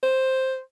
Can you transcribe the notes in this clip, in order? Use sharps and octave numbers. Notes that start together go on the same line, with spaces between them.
C5